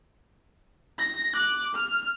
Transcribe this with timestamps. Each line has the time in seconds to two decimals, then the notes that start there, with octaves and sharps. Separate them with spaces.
0.99 A#6
1.35 D6 F#6
1.75 F6